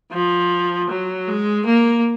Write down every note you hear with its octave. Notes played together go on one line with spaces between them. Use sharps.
F3
F#3
G#3
A#3